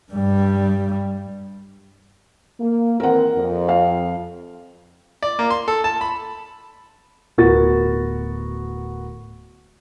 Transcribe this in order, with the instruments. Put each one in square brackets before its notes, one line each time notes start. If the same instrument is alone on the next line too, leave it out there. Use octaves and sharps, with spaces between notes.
[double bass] G2 G3
[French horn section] A#3
[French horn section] D#3 E3 C4 [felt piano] A#4 F#5
[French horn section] F2
[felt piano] F5
[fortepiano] D5
A#3
C6
A4
A5
B5
[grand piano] D1 B3 F#4 A#4 A6